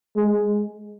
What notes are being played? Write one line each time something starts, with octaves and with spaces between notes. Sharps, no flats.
G#3